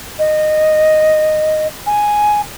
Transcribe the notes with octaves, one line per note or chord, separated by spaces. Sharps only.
D#5
G#5